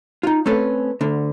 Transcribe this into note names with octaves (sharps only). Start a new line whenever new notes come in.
D#4 F4
A3 C4 C#4 A4 B4
D2 D3